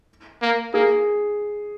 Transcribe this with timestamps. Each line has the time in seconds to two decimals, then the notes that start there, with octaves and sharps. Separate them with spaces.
0.42 A#3
0.74 A#3 G#4